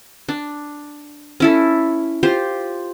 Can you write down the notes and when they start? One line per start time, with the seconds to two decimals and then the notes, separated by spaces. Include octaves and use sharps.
0.29 D4
1.40 C#4 E4 A4
2.23 F4 G4 C5